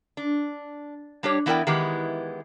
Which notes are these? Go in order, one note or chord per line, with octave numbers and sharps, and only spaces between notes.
D4
G3 D4 G4 C#5
E3 B3 E4 A#4 D5 G5
D#3 E3 G#3 B3 E4 G4